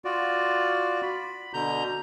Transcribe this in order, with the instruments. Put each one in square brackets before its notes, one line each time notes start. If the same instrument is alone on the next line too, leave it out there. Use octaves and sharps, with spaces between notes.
[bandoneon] F4 F#4 D5
B5
B2 D3 A#5 G6